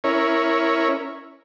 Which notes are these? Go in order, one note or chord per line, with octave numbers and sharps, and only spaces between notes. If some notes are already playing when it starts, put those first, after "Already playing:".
C#4 E4 A#4 C#5